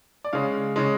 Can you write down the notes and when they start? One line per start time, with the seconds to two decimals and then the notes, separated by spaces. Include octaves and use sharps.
0.24 D5
0.33 C#3 G#3 F5
0.76 C#3 G#3